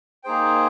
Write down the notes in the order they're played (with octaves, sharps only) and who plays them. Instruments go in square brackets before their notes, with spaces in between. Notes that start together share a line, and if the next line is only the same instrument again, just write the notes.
[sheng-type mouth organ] A#3 D#4 G#4 C5 G5